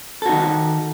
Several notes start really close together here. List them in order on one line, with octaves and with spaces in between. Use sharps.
A4 F#4 D#4 D#3